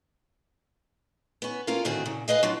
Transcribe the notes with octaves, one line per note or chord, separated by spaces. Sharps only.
B3 C#4
A#3 C#4 F4 A4 A#4 F5
A2 D3 D#3 C4 F#4 G#4
A#2 C#3
G#4 B4 D#5 F5
F#3 D4 F4